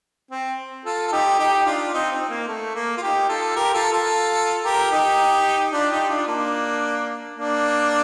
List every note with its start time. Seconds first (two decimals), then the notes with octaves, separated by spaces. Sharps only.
0.31 C4
0.85 F4 A4
1.07 A4
1.12 D#4 G4
1.39 D#4 G4
1.66 D4 F4
1.93 C4 D#4
2.12 C4
2.29 A#3
2.48 A3
2.74 A#3
2.97 F4
3.02 D#4 G4
3.29 F4 A4
3.56 G4 A#4
3.74 F4 A4
3.92 F4 A4
4.65 G4 A#4
4.91 D#4 G4
5.73 D4 F4
5.91 D#4 G4
6.09 D4 F4
6.28 A#3 D4
7.36 A#3 D4